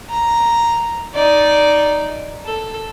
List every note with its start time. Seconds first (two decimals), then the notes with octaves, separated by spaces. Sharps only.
0.10 A#5
1.14 D#4 D5
2.46 A4